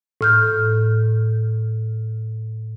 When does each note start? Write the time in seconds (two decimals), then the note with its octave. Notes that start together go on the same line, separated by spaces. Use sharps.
0.21 A2 F6 G6